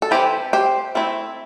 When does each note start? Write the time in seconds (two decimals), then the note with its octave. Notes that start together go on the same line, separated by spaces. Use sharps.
0.02 A4
0.11 E3 C4 E4 G4 C5
0.53 G4 C5
0.95 A3 C4 E4